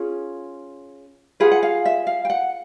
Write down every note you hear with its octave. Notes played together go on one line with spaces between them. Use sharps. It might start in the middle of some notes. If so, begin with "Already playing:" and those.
Already playing: C#4 F4 G#4
F4 G#4 B4 F#5
F#5
F5
E5
F5
G5
F#5